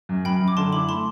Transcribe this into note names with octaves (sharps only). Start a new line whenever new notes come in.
F#2
F#2 G5 B5
F#2
D6
D3 A5 C6
E4 B5 D6
A3 A5 C6